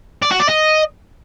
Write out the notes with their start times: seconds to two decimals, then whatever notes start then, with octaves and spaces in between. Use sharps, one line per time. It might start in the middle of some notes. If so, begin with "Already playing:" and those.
0.22 D5
0.31 F#4
0.40 D5
0.48 D#5